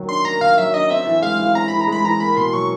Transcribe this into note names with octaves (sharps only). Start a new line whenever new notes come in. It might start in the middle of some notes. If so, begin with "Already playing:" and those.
Already playing: D#3 F#3 A#3
D4 C6
A#3 A#5
D#3 F5
F#3 E5
D4 D#5
C4 E5
E3
G#3 F5
E3
C4 A#5
E3 B5
A#5
G#3 B5
E3 A#5
A#3 B5
B2 C6
F#3 C#6